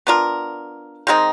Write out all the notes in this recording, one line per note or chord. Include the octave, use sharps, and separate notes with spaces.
B3 D4 F4 A#4
D#3 G#3 C4 D#4